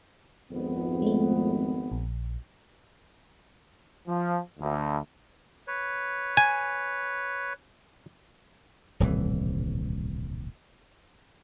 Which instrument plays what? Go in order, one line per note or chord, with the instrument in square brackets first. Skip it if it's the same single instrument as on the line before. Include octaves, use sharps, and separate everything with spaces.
[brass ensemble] G#1 F2 B3
[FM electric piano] G#3 A3
A#1
[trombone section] F3
D2
[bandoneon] B4 C#5
[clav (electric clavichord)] G#5
[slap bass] D#1 C2 A2 E3